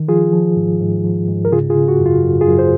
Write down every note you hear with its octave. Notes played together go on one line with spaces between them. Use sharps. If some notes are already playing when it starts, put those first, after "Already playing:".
Already playing: D#3
F3 F4 G#4
F3
G#2
G#2
F3
G#2
A#4
C#3 F4 G#4
F4 G#4
C#3
F#4
F#2
F4
F#2
F4 G#4
F#2
G#4 C5